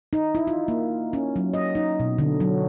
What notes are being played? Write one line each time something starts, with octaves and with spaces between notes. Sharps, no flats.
D#4
E4
F4
A#3
C#4
F#3
D#5
D#4
B2
D3
F#3